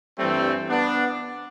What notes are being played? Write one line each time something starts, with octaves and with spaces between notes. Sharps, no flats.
G2 E3 G3 A3 C4
B3 D4